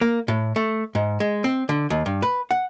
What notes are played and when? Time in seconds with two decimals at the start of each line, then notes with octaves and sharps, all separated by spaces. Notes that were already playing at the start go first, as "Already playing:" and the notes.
0.01 A#3
0.28 A2
0.56 A3
0.95 G#2
1.20 G#3
1.44 C4
1.69 D3
1.90 D#2
2.06 G2
2.22 B4
2.51 F#5